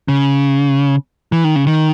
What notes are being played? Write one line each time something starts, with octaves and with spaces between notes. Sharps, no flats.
C#3
E3
D#3
C#3
D#3